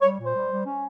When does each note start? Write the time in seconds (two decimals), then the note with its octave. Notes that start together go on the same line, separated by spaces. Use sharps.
0.02 G3 C#5
0.19 A#2
0.26 C5
0.35 G3
0.50 G3
0.66 C#4